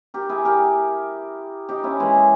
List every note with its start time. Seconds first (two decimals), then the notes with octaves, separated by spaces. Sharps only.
0.14 G4 A#4
0.29 E4 G#4
0.45 G4 A#4
1.69 D#4 G4
1.84 C#4 E4
2.00 E3 G#3